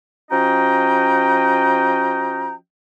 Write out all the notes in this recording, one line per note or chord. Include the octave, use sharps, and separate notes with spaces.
F3 C#4 F#4 D#5 G5 A#5